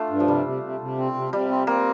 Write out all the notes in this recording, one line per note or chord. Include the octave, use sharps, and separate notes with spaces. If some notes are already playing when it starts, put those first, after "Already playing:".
Already playing: A3 D4 F4
G2
F3
C3 G3
C3
C3
C3
C4
C3
C3 G3
C4
A#3 C4